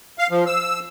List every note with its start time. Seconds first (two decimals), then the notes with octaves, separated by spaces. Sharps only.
0.19 F5
0.31 F3
0.47 E6